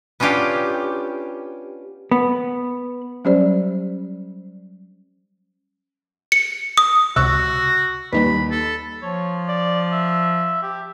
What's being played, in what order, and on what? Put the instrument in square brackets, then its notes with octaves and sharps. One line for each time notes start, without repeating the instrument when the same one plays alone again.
[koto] B3 C#4 D4 F4 G4
[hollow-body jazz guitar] B3
[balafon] F#3 G3 C#4 G4 C5 D5
[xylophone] C#7
D#6
[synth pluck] C#2 C3 [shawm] F#4 [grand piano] C#6 E6 F#6
[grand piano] D#2 [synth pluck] G3 D#4 B4 [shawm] B5
[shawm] A4
[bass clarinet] F3 [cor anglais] C#5
[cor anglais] D5
E5
G4